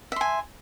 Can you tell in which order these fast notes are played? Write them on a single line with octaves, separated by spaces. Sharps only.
E5 C6 G#5